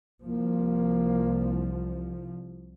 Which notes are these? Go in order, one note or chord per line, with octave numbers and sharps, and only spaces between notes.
C2 F3 A#3